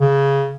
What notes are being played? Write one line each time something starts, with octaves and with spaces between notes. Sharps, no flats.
C#3